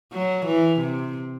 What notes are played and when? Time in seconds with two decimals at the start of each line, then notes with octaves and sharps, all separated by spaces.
0.13 F#3
0.46 E3
0.80 C3